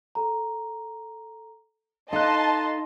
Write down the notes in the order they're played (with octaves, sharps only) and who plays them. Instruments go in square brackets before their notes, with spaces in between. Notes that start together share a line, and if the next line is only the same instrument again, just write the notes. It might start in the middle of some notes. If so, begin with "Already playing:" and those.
[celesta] A4 A#5
[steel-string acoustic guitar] D#4 A4 [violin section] D#5 A5 C6 [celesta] F5 F#6